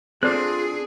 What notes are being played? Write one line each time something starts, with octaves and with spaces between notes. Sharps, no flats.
C4 D4 F4 G#4 A4 D5 F#6